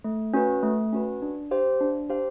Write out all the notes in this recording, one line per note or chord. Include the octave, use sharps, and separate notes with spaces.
A3
C#4 F#4 B4
A3
C#4 F#4 B4
D4
G4 C5 F5
D4
G4 C5 F5